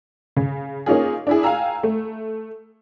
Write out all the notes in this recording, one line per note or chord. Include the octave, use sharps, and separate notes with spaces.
C#3
A#3 C#4 D#4 F4 G#4
D4 E4 G#4
F5 G5 G#5 A#5 E6
A3